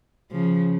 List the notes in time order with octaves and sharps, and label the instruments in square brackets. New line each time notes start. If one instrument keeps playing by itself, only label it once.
[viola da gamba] C#3 F3